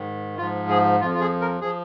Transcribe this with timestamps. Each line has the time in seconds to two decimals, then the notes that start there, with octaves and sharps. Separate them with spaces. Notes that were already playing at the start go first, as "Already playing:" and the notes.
Already playing: G#2 D#3
0.38 G#2 F3 F4
0.69 G#4
1.00 F2 F3 F4
1.14 F4
1.21 G#4
1.41 A#4
1.61 F3 G#4